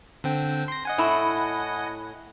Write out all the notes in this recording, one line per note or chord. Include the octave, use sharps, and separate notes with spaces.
D3 C4 G5
C6 A#6
D#5 F#5 G#5
A2 E4